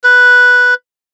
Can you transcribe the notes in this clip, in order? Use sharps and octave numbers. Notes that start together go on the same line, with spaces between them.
B4